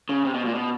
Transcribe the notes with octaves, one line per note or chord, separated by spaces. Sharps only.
C#3
C3
B2
A#2
B2